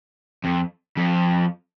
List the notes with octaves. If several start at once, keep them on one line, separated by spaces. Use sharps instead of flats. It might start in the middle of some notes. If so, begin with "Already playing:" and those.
F2
F2